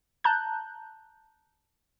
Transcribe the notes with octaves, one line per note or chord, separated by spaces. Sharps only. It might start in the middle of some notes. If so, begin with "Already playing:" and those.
A5 A#5 F#6 G6